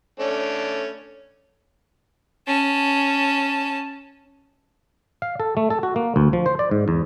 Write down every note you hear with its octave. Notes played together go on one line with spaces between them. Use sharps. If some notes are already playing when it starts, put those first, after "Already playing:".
A3 C#4 D4
C#4 A5
F5
A4
A3
A4
F#4
A#3
D2
F3
C5
D5
G#2
E2